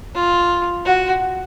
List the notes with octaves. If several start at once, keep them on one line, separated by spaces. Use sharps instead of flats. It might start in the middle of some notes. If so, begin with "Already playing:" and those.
F4
F#4